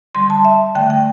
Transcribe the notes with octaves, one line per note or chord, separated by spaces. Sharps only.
D3 G3 C6
A5
E5
D3 A3 G5
G5